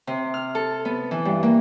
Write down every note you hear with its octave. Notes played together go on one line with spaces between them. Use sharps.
C3
F6
A4
B3
E3
G2
A#3